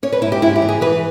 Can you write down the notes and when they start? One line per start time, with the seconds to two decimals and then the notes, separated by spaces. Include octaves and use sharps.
0.03 C#4 C#5
0.12 B4
0.22 G#2 E4
0.32 G4
0.42 G#2 E4
0.56 G4
0.62 E3
0.69 G#4
0.81 E3 B4